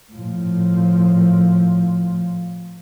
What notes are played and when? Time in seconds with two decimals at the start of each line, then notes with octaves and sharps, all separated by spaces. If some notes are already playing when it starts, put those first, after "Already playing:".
0.13 A2 F3